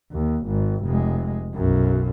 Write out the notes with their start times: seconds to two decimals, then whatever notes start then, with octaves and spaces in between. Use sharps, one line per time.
0.12 D#2
0.46 G#1
0.85 F1 G#3
1.54 B1 F#2